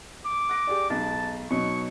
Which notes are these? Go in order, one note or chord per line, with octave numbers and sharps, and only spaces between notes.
D6
F#6 A#6 D7
G4 G#4 D5
B1 B2 G#3 A5
B2 F#3 D#4 C#6